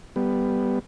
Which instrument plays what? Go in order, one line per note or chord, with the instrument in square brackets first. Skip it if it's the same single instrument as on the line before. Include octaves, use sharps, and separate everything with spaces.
[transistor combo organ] G3 B3